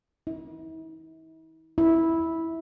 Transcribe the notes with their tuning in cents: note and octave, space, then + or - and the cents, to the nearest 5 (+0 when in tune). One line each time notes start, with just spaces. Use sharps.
E4 -45
E4 -10